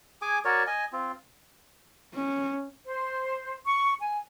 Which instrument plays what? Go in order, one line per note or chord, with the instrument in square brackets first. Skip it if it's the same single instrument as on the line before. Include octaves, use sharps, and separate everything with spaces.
[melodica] G#4 G#5 D6
F#4 A#4 C#5 D5
D#5 G#5
C4 F4
[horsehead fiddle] C#4
[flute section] C5
C#6
G#5